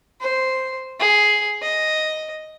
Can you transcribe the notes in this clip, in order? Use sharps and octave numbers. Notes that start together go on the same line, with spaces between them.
C5
G#4
D#5